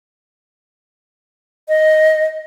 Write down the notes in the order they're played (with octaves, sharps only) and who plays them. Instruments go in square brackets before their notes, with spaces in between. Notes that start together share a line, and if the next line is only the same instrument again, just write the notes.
[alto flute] D#5